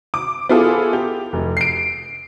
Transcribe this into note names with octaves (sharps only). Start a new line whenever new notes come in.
D6
B3 E4 F4 G#4 A4
G4
F1
C7 D7